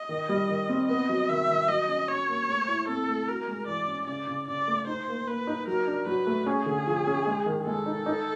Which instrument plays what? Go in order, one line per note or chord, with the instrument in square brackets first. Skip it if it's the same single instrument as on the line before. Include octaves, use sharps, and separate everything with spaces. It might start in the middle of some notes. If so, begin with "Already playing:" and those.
Already playing: [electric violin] D#5
[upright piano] D#3
G3
D#3
C4
[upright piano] B3 [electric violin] D#5
[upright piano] F#3
[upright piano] D#3 [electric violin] E5
[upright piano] D#3
[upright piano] F#3 [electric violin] D#5
[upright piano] C#4
[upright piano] C#4 [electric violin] C#5
[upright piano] A#3
A3
E4
[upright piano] C4 [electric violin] A4
[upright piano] A3
[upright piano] F#4 [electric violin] A#4
[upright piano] G#3
[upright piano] E3 [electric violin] D5
[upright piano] C#4
[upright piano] C#3 [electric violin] D5
[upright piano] C#3
[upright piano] C#3 [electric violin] D5
[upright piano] A3
[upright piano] D#4 [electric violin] C5
[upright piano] A#3
[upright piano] A#3 [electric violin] B4
[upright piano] D#4
[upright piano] F#3 [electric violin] A#4
[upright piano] D4
[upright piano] F#3 [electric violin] B4
[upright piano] A3
[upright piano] C#4 [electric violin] G#4
[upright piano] D3
F3
C#4
G#3
D#3
[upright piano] G#3 [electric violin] A4
[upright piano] D#4
D#4